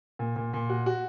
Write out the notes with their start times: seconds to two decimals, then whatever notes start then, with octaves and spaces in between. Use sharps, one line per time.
0.19 A#2
0.36 A#2
0.53 A#2
0.69 F#4
0.86 F#4